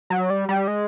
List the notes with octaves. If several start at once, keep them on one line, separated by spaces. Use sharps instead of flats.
F#3
G3
G3
G#3